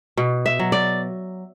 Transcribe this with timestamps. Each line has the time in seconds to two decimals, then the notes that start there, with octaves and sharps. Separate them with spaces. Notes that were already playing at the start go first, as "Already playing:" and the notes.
0.17 B2
0.46 E5
0.59 F#3
0.72 D5